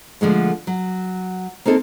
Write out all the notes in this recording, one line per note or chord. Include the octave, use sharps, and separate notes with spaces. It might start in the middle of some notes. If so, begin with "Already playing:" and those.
D3 F3 G#3 A3
F#3
A#3 C4 D#4 A4